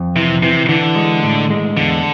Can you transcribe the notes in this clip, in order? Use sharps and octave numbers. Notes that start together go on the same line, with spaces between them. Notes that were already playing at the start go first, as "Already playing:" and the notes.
Already playing: F2
C3 E3
C3 E3
D3 E3
G#3
A2
G#3
E2 D3